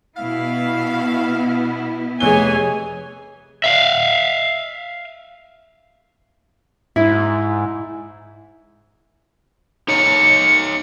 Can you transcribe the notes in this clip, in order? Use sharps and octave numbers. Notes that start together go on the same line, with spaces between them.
B2 B3 E4 F5
F1 E3 G#4 C#5 G#5 G7
E5 F5
G#2 E4
D#4 C#5 A#5 C#7